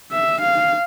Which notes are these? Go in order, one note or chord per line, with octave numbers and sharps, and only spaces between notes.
E5
F5